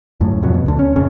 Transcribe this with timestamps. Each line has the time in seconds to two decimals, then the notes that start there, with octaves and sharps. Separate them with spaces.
0.20 D1 F#2 A2
0.43 F2 C3 F#3
0.54 B2
0.66 D2 D3
0.79 C#4
0.95 F1 A#1 C#3 C#4